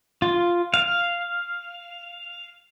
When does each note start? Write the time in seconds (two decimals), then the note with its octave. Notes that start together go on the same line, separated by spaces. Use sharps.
0.22 F4
0.74 F5